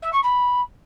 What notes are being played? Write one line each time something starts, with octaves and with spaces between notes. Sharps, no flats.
E5
C#6
B5